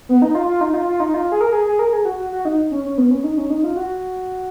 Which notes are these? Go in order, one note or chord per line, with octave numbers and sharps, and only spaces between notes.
B3
D#4
F4
F4
D#4
F4
F4
D#4
F4
G#4
A#4
G#4
G#4
A#4
G#4
F#4
F#4
F#4
D#4
C#4
C#4
B3
C#4
D#4
C#4
D#4
F4
F#4